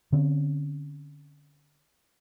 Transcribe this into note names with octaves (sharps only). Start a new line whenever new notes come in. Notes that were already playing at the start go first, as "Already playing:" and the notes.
D3 C4 C#4